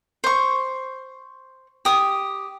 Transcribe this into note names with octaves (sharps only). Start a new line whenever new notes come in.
C5 C#6
G4 D#6